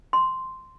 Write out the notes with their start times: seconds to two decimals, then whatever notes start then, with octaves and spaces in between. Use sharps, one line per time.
0.13 C6